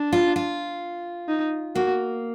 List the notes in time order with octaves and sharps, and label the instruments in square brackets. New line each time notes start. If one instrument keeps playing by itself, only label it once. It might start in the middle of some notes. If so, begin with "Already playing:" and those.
Already playing: [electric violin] D4
[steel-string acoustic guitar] F4
F4
[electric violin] D#4
[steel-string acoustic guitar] A#3 [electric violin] F#4